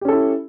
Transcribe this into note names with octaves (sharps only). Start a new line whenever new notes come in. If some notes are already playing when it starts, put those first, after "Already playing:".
C#4 E4 G4 A4